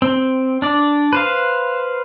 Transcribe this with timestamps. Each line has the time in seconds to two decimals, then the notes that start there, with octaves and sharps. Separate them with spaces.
0.02 C4
0.62 D4 D5
1.13 B4 C5 F5